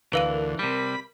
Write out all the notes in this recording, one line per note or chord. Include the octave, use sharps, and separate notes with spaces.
D2 E3 A#4 B4 F5 D#7
C3 G3 B5